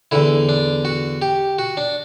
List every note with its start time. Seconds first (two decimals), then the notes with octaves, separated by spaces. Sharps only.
0.11 E2 D3 E4
0.49 D4
0.85 F#4
1.22 G4
1.59 F#4
1.77 D4